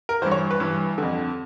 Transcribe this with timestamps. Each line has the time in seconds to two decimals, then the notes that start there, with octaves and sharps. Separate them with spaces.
0.09 A#4
0.22 E3 C5
0.26 G2
0.31 C#5
0.51 B4
0.60 G2 E3
0.98 F2 D3